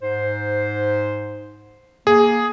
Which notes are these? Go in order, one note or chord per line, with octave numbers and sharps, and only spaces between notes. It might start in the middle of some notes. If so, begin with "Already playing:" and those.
G#2 C5
A#3 G#4